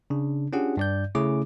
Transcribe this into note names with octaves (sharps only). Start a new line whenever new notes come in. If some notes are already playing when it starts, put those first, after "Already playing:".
C#3 D4
C#4 D4 F4 G4 G#4 F#5
G2 D5 G6
C#3 A3 C#4 E4 G#4 D6